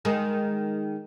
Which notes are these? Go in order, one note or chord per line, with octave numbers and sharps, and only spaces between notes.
D#3 G#3 D#4